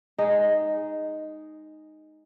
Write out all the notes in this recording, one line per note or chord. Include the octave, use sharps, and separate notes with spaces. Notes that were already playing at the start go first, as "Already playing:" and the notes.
G#3 D#4